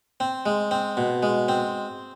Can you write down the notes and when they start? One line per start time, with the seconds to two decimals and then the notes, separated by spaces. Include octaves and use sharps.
0.20 C4
0.46 G#3
0.71 C4
0.97 B2
1.23 G#3
1.49 C4